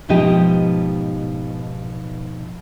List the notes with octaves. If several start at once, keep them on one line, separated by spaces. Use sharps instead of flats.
G#2 B2 F3 D#4 G4 D#5